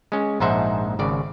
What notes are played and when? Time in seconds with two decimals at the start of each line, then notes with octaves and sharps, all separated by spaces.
0.12 G#3 C#4
0.40 A#1 G#2 D#4 C5 E5 F#5
0.99 G#1 C#3 D5